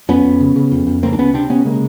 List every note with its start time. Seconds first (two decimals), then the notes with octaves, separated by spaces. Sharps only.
0.09 F2 B3 C#4
0.24 F2
0.40 C#3
0.56 C#3
0.71 F2
0.87 F2
1.03 C#2 A#3 C4
1.13 D4
1.18 C#2 B3 C#4
1.34 C3 C4 D4
1.50 C3 B3 C#4
1.65 C#3 G#3 A#3